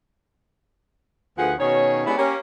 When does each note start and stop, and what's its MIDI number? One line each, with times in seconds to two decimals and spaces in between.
1.38 1.53 38
1.38 1.53 53
1.38 1.53 68
1.38 1.53 71
1.38 1.53 78
1.59 2.04 47
1.59 2.04 51
1.59 2.04 61
1.59 2.04 68
1.59 2.04 73
2.06 2.14 56
2.06 2.14 59
2.06 2.14 61
2.06 2.14 62
2.06 2.14 64
2.06 2.14 67
2.18 2.36 58
2.18 2.36 61
2.18 2.36 67